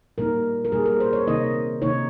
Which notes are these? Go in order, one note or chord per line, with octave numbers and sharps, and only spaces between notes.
A#2 G3 A#3 D#4 A#4
A#4
A#2 G3 A#3 D#4 G#4
A#4
C5
C#5
C3 D#3 A#3 D#4 D#5
C3 D#3 A#3 D#4 C#5